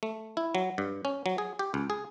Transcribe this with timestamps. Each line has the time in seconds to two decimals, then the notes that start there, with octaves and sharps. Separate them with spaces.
0.03 A3
0.37 E4
0.55 F#3
0.78 G2
1.05 C#4
1.26 F#3
1.38 G#4
1.59 G4
1.74 C#2
1.90 G#4